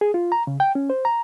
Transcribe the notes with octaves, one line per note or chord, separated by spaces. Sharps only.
G#4
F4
A#5
C#3
G5
C#4
C5
A#5